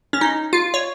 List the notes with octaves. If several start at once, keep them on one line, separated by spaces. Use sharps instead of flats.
C#4
D#4
F4
C#5